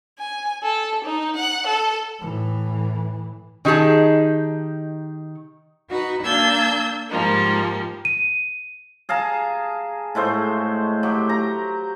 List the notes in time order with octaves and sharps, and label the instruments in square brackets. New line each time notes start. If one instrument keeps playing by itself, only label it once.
[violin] G#5
A4
D#4
F#5
A4
[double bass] A2 E3
[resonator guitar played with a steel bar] D#3 D#4 G4 G#4 A5
[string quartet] D#4 F#4 B4
A#3 D4 A5 E6 G6 G#6
G#2 F3 G3 A#3
[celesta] D#7
[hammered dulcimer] G#4 F5 A5 A#5
A2 G#3 A3 C5
F#3 G4
A#5